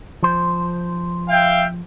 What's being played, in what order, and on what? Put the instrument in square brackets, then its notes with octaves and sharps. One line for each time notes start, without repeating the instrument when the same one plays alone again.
[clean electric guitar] F3 C5
[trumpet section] E5 F5 G5